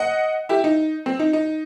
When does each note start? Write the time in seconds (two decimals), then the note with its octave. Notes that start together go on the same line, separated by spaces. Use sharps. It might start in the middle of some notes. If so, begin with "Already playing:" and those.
Already playing: D#5 F#5
0.49 E4 G4
0.64 D#4
1.06 C4
1.19 D#4
1.33 D#4